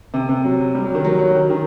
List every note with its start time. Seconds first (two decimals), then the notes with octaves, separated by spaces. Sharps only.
0.14 C3
0.29 C3
0.44 F#3
0.75 G3
0.84 F#3
0.95 D#3
1.05 F#3
1.19 F#3
1.35 D#3
1.50 D#3